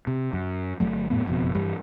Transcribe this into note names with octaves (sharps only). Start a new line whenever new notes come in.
C3
F#2
G1 F2 F#3 A3
F#2 A2 A3 B3
F#1 F2 B2
G2 E3 G3